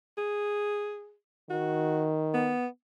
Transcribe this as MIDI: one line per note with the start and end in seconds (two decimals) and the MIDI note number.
0.18 1.14 68
1.50 2.55 51
1.50 2.08 66
2.34 2.67 59